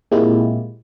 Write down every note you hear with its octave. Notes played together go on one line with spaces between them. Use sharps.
A#2 G#3 A#3 C4 E4 G4